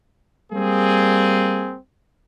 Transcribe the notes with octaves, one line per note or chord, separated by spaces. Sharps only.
G3 A#3 C4 G#4